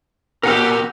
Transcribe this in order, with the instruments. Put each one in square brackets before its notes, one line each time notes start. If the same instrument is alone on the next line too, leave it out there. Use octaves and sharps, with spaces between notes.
[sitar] A#2 G4 [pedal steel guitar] A#4 F#5 E6